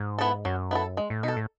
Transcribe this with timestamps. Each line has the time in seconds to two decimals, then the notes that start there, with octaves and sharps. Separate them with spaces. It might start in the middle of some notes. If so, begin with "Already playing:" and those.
Already playing: G#2
0.18 B3 E4 A4
0.45 F#2 F#3
0.71 B3 E4 A4
0.97 G#3
1.10 A2
1.23 B2 D#4 A4
1.37 A2